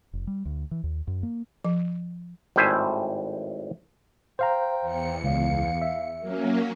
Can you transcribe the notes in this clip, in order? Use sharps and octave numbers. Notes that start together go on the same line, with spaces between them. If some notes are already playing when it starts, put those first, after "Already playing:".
F1
G3
D2
E3
D#2
F#2
A#3
F3
G#1 A2 G3 C5 E5 G#5
C5 F5 G5 A#5
E2 C#7
C#2 F5
E5
F#3 A#3 C#4 A#4